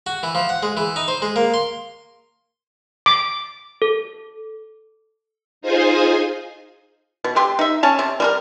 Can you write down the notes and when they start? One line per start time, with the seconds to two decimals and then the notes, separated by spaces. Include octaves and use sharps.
0.07 F#4
0.23 E3
0.35 F3
0.49 F#5
0.63 G#3
0.77 E3
0.96 D#4
1.08 C5
1.22 G#3
1.36 A#3
1.54 C6
3.06 D6
3.82 A4
5.61 D#4 F4 G#4 C5 G#5
7.24 B2
7.36 D3 G4 C6
7.59 D#4 E5
7.83 C#4 C#5 A5
7.99 C3 C4
8.20 G3 F4 A#4